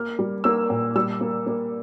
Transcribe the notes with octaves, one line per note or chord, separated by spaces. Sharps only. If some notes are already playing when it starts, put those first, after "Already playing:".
Already playing: A#3 F6
G3
A#3 E6
A#2
G3 E6
A#3
A#3